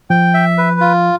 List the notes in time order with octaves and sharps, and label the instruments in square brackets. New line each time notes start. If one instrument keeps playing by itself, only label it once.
[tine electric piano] F3 [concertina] G5
[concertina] E5
B4
F4